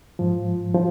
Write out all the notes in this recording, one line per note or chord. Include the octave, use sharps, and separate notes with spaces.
G#2 F3
F3